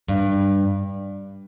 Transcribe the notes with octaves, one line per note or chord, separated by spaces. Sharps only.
G2